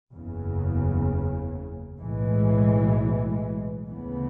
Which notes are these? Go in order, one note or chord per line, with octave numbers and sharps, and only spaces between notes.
F#1 E2 C#3
B1 A2 E3 G#3
D2 C#3 E3 B3